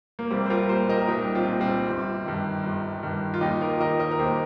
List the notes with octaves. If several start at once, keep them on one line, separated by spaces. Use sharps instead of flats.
A#3
C2 G3 C4
C5
F4 A#4
A#2 G4 C5
A#4 D#5
A#4
C2 D#4 G4
C4 F4
A#2
G3 C4
G1
G2 D#3
G1
G2 D#3
F4
D#2 D#4 G4
F4 A#4
D#3 A#4 D#5
A#4 D#5
A#4
D#2 G4 C5